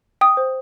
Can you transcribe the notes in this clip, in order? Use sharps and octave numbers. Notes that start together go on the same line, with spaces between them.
G5 D#6
C5